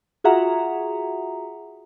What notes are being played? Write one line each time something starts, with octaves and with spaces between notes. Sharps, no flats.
F4 F#4 G#4 E5 F#5 A#5